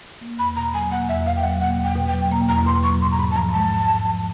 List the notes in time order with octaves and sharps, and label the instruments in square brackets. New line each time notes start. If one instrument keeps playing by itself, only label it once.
[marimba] A#3
[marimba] E2 [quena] B5
[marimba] B2 [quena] A#5
[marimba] F#3 [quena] G#5
[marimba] A#3 [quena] F#5
[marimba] E2 [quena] E5
[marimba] B2 [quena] F5
[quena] G5
[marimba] F#3 [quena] F#5
[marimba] A#3 [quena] F#5
[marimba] E2
[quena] G5
[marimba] B2
[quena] G5
[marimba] F#3
[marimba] A#3 [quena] A#5
[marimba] E2 [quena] A#5
[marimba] B2 [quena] C6
[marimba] F#3 [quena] C#6
[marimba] G#2 [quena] C6
[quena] A#5
[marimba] G#2 [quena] B5
[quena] A5
[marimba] F3 [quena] A#5
[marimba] G#3 [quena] A5
[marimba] G#2
G#2
F3